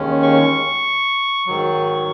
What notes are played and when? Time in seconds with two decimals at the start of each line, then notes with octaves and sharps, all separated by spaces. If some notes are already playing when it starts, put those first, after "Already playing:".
Already playing: D#2 D#3 G#3 C#4
0.22 C#6
1.47 G#2 D#3 F#3